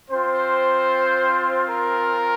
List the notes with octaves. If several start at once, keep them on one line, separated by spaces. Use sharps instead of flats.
C4 F4 C5
A#4